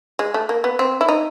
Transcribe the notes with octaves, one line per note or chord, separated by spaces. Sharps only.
G#3
A3
A#3
B3
C4
E4
D#4